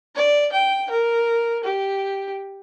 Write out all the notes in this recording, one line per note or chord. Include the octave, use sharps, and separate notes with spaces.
D5
G5
A#4
G4